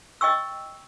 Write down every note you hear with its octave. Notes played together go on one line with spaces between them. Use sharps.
D#5 G5 C#6 E6